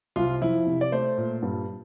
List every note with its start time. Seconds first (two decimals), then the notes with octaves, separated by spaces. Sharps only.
0.16 C2 F4
0.42 F2 E4
0.66 C3
0.81 D5
0.92 A3 C5
1.17 A#2
1.42 G2